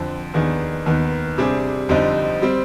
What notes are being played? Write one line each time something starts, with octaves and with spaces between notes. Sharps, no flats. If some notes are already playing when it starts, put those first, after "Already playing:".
Already playing: F2 D3 F3
D#2 D#3 B3 D4 G#4
D#2 D#3 B3
C3 G3 D4 G#4 C5
F2 D3 G3 C4 D#4
G3 C4